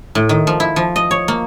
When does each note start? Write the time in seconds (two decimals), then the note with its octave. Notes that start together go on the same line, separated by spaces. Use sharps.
0.15 A2
0.29 D#3
0.47 F3
0.60 E4
0.76 F3
0.96 D#5
1.11 C#5
1.28 A#3